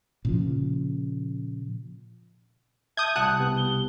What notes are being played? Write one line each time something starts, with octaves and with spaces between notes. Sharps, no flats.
A#2 C#3 F3
E5 A5 D#6 G6 G#6
C2 F#5 A5 D#6 F#6
C3 B3 G4
G7